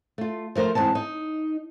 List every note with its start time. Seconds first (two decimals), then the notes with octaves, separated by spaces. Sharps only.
0.18 A3 F4
0.55 F3 A3 A#4 C5
0.75 E2 G#2 C4 A5
0.95 D#4